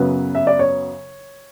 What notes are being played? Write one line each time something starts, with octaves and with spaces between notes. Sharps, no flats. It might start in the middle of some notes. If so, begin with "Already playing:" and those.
Already playing: F#2 C#3 F#3 B3 B4
E5
D5
C#5